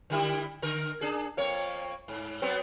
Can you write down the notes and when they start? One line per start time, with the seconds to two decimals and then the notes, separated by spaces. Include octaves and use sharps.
0.10 D3 G3 E4
0.62 D3 A#4
1.01 D4 G#4
1.37 F2 A#3 C#5
2.08 G#2
2.42 F#3 B3 C4